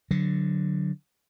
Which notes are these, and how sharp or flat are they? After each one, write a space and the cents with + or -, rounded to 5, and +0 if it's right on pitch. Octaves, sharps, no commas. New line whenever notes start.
D3 +5 F#3 +0